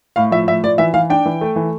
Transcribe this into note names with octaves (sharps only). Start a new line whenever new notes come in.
A2 F5
F3 E5
A2 E5
F3 D5
E3 E5
E3 F5
D4 G5
E3
A3
E3